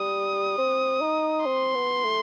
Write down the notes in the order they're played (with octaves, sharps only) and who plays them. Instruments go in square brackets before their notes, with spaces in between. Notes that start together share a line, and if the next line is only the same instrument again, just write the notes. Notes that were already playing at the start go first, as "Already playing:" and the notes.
Already playing: [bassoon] G3 [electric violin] D#6
[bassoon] C4
D#4
[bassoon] C4 [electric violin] C6
[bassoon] B3
A3